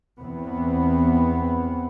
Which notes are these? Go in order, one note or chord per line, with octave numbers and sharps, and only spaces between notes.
E2 B3 C4